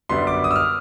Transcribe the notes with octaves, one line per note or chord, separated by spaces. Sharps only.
F#2 D3 G3 B3 C6
D6
D#6
E6
F6